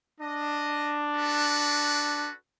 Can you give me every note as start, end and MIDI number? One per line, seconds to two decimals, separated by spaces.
0.20 2.30 62
0.20 0.94 75
1.14 2.33 66
1.14 2.33 69
1.14 2.33 71